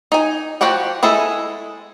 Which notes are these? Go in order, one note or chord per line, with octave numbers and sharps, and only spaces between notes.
D#4 G#5
F3 F#4 G4 F#5 G5
G#3 E4 G#4 A4